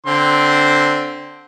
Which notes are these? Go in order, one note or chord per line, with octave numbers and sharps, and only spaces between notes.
D3 C4 C6